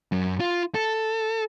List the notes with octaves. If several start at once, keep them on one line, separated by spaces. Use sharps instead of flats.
F#2
F4
A4